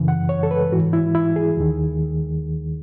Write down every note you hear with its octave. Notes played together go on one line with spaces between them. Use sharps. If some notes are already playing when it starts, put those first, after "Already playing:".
Already playing: F#2 C#3 E3
F#5
C#5
A4
B4
G#2 E3 F#4
E4
E4
G#4
D#2 D#3